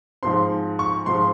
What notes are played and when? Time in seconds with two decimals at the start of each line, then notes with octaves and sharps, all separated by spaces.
0.23 G#2 F3 C4 C6
0.79 C#6
1.06 G#2 F3 C4 C6